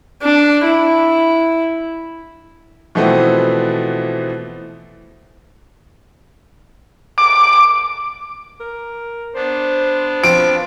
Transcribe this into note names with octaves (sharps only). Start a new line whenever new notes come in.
D4
E4
B2 E3 F3 A3 B3 C4
D6
A#4
B3 D4 C5
F3 C4 D7